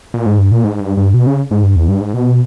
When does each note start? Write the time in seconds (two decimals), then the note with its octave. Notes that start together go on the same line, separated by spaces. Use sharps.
0.14 A#2
0.26 G#2
0.39 G2
0.52 A#2
0.64 G#2
0.80 G2
0.97 G2
1.14 B2
1.27 C#3
1.51 G#2
1.63 G2
1.76 E2
1.88 G2
2.01 G#2
2.14 B2